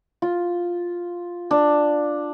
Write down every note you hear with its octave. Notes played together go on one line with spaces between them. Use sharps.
F4
D4